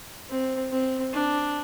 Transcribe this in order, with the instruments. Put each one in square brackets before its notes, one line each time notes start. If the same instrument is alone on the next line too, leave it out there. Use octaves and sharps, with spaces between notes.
[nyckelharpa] C4
C4
D4